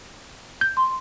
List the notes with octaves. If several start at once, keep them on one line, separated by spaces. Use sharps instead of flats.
G6
C6